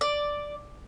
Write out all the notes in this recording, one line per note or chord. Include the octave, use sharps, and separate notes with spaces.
D5